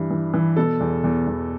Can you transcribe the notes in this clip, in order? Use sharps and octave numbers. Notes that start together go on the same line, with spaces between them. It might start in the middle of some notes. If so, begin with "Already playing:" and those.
Already playing: G2 E3
E3
E3
B2 A4
E2
E2
E2